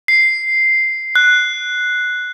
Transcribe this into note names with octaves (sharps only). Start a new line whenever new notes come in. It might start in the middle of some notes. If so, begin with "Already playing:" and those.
C7
F#6